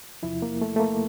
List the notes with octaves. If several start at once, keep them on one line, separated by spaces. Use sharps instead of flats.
E2 C3 F3 E4
A#3
A3
A3
A#3